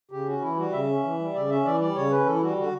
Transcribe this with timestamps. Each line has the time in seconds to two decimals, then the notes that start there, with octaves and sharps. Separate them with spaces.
0.11 C#3 G4
0.26 C#4 F#4
0.41 E3 E4
0.57 G3 F#4
0.72 C#3 E5
0.88 C#4
1.04 E3
1.19 G3
1.34 C#3 D5
1.50 C#4 E5
1.65 E3 D5
1.81 G3 D5
1.95 C#3 C#5
2.11 C#4 B4
2.26 E3 A4
2.35 E4
2.41 G3 F#4
2.57 D3 F#4